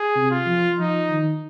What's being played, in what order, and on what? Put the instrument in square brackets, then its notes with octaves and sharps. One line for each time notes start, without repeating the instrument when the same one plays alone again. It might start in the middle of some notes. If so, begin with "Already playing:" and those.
Already playing: [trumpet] G#4
[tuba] C3
[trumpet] F4
[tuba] F3
[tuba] F3 [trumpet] D#4
[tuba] D#3